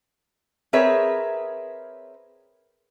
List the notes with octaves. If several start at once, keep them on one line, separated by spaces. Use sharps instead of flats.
C4 G#4 A#4 B4 C#5 E5